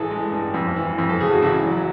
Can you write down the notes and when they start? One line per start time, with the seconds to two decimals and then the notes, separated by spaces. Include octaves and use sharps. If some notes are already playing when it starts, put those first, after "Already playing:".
Already playing: A1 E3 G#4 A4
0.11 G#3
0.32 G2
0.54 F2
0.76 E3
0.98 F2
1.09 A4
1.20 C#3 G#4
1.31 F#4
1.42 A1 E4
1.64 F#3